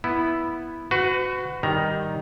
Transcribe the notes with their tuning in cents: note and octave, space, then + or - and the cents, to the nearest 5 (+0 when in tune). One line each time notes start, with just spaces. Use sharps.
B3 -5 E4 +0
F#4 +0 B4 +35
D#3 +0 G3 +0 A#5 +15